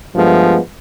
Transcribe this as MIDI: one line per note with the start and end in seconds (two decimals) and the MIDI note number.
0.16 0.57 43
0.16 0.57 53
0.16 0.57 56
0.16 0.57 57
0.16 0.57 59